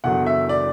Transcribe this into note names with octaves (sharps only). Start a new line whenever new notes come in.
F#1 E2 D3 F#3 F#5
E5
D5